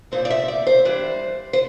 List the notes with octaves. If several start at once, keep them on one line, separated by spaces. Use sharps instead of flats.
A#2 F3 C4 C5
D5
E5
D5
C5
E3 G3 D4 C5
C5